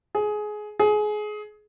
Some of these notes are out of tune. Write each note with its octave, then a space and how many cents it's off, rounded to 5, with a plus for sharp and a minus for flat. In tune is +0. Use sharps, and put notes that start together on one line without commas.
G#4 +20
G#4 +25